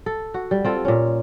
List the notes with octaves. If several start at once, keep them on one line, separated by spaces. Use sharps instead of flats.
A4
F#4
G3
C4 F4 A4
A#2 C#4